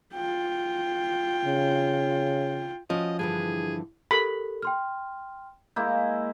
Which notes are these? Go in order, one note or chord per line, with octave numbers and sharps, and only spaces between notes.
F4 G5
C#3
F3 C#4 F#4 D#5
G2 D3 E3 G#4
G4 A4 A#4 B5
G5 C6 F6
G#3 A#3 E4 G6